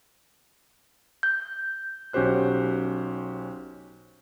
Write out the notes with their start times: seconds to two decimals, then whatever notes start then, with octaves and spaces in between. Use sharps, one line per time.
1.23 G6
2.13 B1 C#4 F#4 G4 C5 F#6